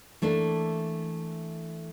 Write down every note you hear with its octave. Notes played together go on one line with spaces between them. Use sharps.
E3 A3 A#3 D4